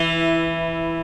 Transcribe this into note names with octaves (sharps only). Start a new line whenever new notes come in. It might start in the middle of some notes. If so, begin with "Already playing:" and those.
Already playing: E3 E4